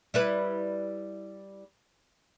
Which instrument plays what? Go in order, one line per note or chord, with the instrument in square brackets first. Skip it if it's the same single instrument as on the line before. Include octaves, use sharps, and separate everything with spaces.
[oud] G3 E4 B4